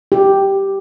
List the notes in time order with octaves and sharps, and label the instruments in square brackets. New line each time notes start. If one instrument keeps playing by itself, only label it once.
[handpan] G4